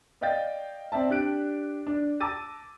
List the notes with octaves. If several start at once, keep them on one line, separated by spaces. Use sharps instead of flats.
D5 D#5 F5 G5 G6 A6
C4 D5 E5 A5
D4 G4 F#6 D7
D4
A5 A#5 D6 E6 A6 D#7